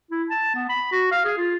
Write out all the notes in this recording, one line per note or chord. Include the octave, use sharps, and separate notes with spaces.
E4
A5
B3
B5
F#4
F5
G#4
F4